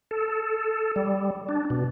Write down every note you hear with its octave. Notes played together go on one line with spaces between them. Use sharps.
A4
G3
D4
B2